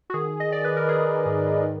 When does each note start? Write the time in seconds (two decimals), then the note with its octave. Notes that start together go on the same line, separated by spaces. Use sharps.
0.10 F#4
0.14 D#3 G#4
0.40 D#5
0.51 D#3 D5
0.64 B4
0.76 A#4
0.88 D#3 G#4
1.26 G#2
1.63 D#3